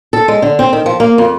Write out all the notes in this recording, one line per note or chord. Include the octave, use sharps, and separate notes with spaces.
A4
G#3
D3
C4
D#3
F3
A#3
F2